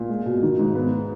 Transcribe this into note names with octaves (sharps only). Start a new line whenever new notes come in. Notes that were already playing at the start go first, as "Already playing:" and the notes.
Already playing: A#2
G#3
B2
D#3
G#2
B3
G#3